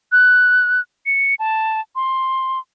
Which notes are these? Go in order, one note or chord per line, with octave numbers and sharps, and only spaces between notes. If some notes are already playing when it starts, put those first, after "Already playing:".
F#6
C#7
A5
C6